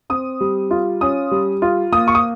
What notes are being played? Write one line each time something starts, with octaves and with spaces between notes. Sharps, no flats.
C4 D#6
G3
F4
C#4 D#6
G3
F4
A#3 D#6
C#6
D#6